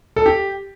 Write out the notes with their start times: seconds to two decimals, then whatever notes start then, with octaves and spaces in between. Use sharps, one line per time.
0.16 A4
0.26 G4